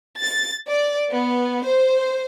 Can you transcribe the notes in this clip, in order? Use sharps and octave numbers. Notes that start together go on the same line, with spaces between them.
A6
D5
B3
C5